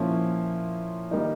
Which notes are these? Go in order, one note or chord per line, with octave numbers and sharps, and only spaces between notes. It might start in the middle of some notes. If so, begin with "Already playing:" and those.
Already playing: A#2 F3 A#3 C#4 E4
D#3 G3 A#3 D#4